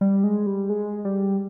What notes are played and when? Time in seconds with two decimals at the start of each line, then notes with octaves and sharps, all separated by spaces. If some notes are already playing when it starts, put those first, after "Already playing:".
0.01 G3
0.24 G#3
0.47 G3
0.69 G#3
1.05 G3